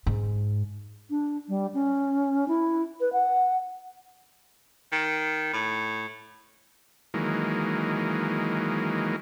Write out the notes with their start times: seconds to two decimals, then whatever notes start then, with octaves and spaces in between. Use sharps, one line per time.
0.06 G#2
1.10 D4
1.49 G3
1.74 C#4
2.48 E4
3.01 B4
3.13 F#5
4.92 D#3
5.53 A2
7.14 D#3 E3 F#3 G#3 A#3